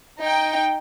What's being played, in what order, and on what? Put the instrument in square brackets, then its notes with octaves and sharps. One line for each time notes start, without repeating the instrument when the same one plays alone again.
[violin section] D#4 G5